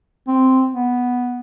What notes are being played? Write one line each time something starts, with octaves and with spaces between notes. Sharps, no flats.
C4
B3